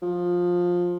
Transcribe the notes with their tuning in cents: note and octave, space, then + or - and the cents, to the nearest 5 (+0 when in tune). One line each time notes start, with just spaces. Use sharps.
F3 +15